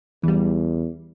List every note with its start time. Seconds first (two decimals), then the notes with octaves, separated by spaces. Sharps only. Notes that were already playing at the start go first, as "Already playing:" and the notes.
0.23 E2 E3 G3